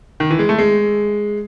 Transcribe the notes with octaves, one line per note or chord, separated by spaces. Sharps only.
D#3
E3
G#3
A3
G#3